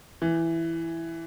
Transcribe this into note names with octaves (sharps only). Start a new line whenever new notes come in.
E3